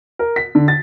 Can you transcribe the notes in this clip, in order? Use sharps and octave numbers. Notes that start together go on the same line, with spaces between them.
A#4
B6
D3
A6